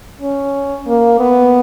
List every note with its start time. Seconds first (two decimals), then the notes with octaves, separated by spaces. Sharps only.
0.21 C#4
0.87 A#3
1.20 B3